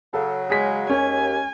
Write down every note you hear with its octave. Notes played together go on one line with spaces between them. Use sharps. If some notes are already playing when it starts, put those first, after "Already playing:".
C#3 F#3 A4
G#3 G#4 B6
D#2 C#4 G#5